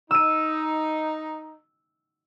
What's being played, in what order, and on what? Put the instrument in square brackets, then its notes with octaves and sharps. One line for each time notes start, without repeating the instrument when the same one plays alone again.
[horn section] D#4 [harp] E6 D#7